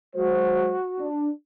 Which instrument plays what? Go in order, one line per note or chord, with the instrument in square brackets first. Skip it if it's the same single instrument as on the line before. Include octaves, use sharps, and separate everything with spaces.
[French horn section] F#3 G#3 C5 [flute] F#4
[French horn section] D4